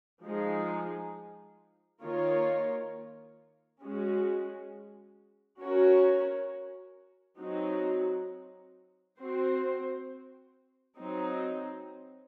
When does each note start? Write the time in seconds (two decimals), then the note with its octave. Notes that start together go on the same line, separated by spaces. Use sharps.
0.24 F3 G#3 D#4 G#4
2.03 D#3 A#3 F4 A#4 C#5
3.82 G#3 C#4 F#4
5.61 C#4 F#4 A#4 C#5
7.40 F#3 C4 D#4 F#4
9.18 C4 F#4 C5
10.97 F#3 C4 D#4